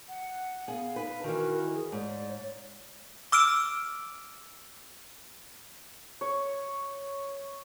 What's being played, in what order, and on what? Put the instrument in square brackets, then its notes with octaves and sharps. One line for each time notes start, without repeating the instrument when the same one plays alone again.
[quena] F#5
[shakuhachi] B3 [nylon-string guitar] G#4 G#5 [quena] F5
[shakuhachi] D#4 [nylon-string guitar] B4
[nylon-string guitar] D#3 E3 [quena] F#4 [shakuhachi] A#4
[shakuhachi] G#4
[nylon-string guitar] G#2 [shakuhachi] C#5 [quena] D5
[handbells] D6 E6 F6 D7
[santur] C#5